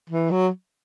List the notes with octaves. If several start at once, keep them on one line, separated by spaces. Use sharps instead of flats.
E3
F#3